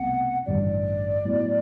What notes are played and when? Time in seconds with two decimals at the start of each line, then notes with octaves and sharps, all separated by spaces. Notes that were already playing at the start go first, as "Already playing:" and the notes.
Already playing: C2 B2 A3 C4 F#5
0.46 A1 G2 D3 G3 D5
1.25 A2 F#3 B3 E4